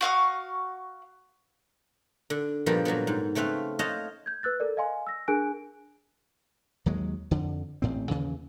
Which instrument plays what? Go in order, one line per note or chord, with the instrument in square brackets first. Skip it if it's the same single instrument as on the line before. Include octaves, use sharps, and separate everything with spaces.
[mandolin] F#4 F5 C#6 D#6
[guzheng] D3
G2 A#2 F3 G3 A#3 B3
A#2 F#3 G3 B3
G#2
C#3 A3 C4 B4 F5
C5 C#5 D#5 F5 F#5 A5
[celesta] G6 G#6
B4 E6 F#6 A6
A4 A#4 D5
D#5 F5 G#5 C6
E6 A#6
D4 G#4 A#4 G#5 F#6 D7
[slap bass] D#2 F#3 G#3
F2 D3
A1 A2 C4
D#2 C#3 E3